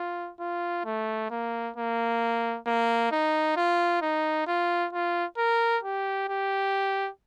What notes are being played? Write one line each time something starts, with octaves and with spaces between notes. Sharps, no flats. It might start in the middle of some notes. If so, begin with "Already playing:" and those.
Already playing: F4
F4
A3
A#3
A#3
A#3
D#4
F4
D#4
F4
F4
A#4
G4
G4